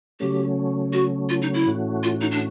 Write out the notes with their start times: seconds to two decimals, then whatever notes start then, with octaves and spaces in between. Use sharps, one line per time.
0.20 C#3 F#3 A3 C#4 G4
0.93 F#4
1.29 F4
1.42 D#4
1.54 E4
1.66 A2 E3 A3 C#4 F#4
2.03 F4
2.21 D#4
2.31 D4